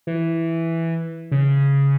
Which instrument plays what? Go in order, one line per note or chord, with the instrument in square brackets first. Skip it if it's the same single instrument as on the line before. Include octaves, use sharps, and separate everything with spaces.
[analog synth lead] E3
C#3